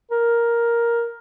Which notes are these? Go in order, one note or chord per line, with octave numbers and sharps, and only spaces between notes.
A#4